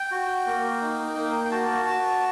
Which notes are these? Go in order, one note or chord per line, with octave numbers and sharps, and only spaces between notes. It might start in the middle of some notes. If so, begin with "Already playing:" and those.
Already playing: G5
F#4
A#3
D#4
A#3
G5
F#4 A5
F#4